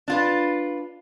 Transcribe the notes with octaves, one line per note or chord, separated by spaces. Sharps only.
D4 F4 B4